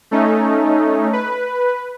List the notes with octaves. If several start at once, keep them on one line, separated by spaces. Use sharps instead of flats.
A3 C#4 D#4
B4